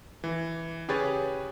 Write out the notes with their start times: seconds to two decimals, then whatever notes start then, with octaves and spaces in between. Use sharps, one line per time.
0.24 E3
0.88 C#3 G4 G#4 B4 C#5 A6